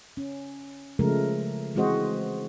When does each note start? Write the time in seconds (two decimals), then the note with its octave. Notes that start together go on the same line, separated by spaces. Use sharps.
0.17 C#4
0.99 C#3 F3 G#3 A3 A#4
1.75 E3 G#3 C4 F#4 C5 D#5